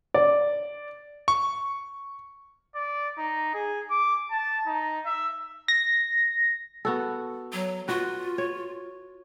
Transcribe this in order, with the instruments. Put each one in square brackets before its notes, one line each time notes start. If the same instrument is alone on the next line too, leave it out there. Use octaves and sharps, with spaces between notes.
[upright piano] D5
[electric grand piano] C#6
[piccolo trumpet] D5
D#4
G#4
D6
A5
D#4
E5
[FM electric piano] A#6
[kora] B3 F#4 A4
[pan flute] F#3
[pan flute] F4 [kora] F#4 B4
[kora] C#5